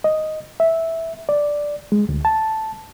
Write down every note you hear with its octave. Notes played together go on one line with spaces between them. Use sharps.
D#5
E5
D5
G#3
D2
A5